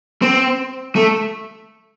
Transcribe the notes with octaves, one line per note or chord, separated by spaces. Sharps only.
C4
A3